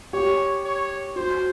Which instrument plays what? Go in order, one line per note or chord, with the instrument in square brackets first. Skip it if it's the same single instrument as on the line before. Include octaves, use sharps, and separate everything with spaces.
[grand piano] G4 [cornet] C#5
[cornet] C#5
[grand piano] F#4 [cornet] C5